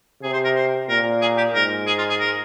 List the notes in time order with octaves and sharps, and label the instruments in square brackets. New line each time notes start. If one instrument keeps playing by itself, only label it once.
[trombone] C3 [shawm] G#4
[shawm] C5
A#4
C5
[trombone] A#2 [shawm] A#4
[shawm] G#4
G4
[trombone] G#2 [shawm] A#4
[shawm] G#4
F4
G#4
A#4